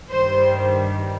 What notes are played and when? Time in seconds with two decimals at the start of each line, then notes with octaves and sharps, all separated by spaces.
0.08 G2 D#3 G3 C5